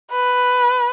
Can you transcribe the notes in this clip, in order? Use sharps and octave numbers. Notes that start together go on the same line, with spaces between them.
B4